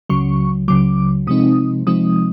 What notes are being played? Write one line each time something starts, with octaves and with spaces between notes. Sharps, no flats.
C#2 C#3 F#3 C#6
C#2 C#3 F#3 D6
C3 F3 G#3 C4 D#4 D#6
C3 F3 G#3 C4 D#4 D#6